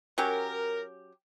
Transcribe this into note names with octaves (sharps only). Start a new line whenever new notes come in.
F#3 C#4 G4 A#4